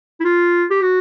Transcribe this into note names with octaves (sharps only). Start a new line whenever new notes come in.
E4
F4
G4
F#4